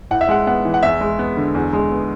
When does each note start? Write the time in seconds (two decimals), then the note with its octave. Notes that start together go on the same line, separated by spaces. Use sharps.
0.11 A2 F#5
0.21 E5
0.29 G#3 F#5
0.47 B3 F#5
0.65 E3
0.74 F#5
0.83 E2 E5
1.01 G#3
1.19 B3
1.37 D3
1.55 E2
1.73 G#3
1.91 B3